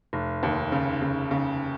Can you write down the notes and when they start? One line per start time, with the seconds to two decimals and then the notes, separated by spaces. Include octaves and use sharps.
0.13 F1
0.43 D#2
0.72 C#3
1.02 C#3
1.31 C#3